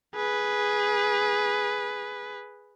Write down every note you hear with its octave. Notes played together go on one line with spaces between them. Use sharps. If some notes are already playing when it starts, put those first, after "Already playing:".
G#4 B4